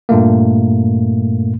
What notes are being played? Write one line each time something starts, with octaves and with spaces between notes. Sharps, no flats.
G2 A#2 A3 A#3